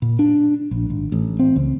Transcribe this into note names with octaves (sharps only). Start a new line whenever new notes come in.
A#2
D4
A#1
G#1
A1
C4
C#2